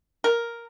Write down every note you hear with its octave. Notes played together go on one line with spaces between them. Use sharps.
A#4